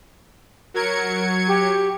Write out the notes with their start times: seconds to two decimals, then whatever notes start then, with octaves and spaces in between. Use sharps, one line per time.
0.74 F#3 A#4 G#6 C#7
1.47 G4